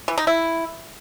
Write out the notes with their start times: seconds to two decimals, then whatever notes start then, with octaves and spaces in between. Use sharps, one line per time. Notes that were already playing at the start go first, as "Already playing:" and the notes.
0.08 E3
0.18 D#4
0.27 E4